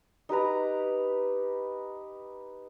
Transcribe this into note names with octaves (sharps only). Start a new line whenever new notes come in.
D#4 G4 B4 A#5